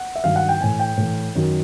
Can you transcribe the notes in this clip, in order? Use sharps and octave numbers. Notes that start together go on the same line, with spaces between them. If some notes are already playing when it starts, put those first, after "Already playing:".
Already playing: F#5
E5
G2 D#3 F#3 F5
F#5
G5
A2 E3 G#5
G5
A2 E3
F#2 D#3 F#3